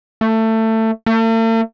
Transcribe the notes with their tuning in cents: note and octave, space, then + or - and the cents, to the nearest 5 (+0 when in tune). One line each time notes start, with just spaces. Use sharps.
A3 +20
A3 +45